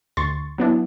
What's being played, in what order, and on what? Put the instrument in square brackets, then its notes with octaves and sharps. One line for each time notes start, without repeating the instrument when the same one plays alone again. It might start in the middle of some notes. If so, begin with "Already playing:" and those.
[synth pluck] D2 C6 C#6 A6
F#3 B3 D4 E4